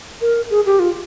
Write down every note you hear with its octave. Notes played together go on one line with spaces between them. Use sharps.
A#4
G#4
G4
F4